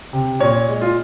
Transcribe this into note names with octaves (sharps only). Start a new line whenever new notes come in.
C3
A#2 C#5
G#3
F4